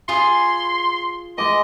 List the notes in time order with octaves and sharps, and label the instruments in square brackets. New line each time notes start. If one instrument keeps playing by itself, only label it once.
[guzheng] F4 G#4 G#5 [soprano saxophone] C6
[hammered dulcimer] G#3 D6 [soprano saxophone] D#5